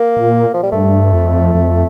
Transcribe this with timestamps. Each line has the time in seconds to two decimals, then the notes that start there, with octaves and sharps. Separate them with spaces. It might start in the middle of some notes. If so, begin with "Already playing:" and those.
Already playing: A#3
0.17 A#2
0.54 F3
0.63 G3
0.72 G2 A3
1.13 F2
1.55 F2